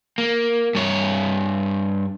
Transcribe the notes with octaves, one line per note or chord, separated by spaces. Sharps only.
A#3
G2 C#5